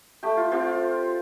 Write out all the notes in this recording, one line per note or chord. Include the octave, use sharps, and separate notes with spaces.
A3 G4
F4
C4 F4 G4
F4